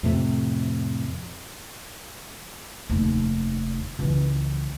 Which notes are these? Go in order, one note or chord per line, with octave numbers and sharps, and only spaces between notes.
F2 A2 C3
F1 D#2
C#2 E3